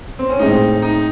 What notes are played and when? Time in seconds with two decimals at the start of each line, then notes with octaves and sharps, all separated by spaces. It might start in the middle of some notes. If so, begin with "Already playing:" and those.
0.19 C4
0.30 C#4
0.39 A2 G#3 C4 D#4
0.82 D#4